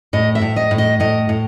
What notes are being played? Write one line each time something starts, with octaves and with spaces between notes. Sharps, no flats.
A2 D#5
E5
A2
D#5
A2
D#5
A2 D#5
A2